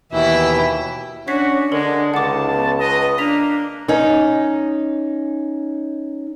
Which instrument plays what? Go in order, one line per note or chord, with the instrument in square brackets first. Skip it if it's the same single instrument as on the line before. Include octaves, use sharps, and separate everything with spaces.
[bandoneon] D#2 B2 E3 [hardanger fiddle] E4 G5
[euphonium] C#4 [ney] D4 [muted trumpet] F#4 [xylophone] C#5 B6 C7
[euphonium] D3 [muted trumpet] G#3 [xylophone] A4 A#4 F#7
[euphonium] C#2 [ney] D#4 [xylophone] F#5 D6 [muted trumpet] A5
[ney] B3
[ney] B4 [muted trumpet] D#5
[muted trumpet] A#3 [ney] D4 [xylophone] B6 F7
[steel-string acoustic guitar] C#4 D#4